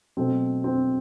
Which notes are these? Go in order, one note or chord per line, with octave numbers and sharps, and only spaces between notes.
B2 F#3 A3 C4
C4